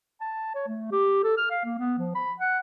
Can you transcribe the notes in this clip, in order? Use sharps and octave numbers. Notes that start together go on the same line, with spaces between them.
A5
C#5
A3
G4
A4
F6
F5
A#3
B3
F3
B5
F#5